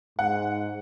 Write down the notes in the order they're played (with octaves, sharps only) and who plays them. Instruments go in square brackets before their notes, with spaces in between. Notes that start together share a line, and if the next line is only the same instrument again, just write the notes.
[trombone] G#2 [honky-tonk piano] F#5